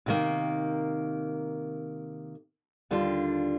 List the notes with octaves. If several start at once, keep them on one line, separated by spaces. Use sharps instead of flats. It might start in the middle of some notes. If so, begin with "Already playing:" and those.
C3 D#3 A#3
D#2 D3 G3 D4 F4